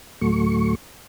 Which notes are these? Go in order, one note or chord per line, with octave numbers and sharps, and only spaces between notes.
D2 A2 F#3 A3 C#6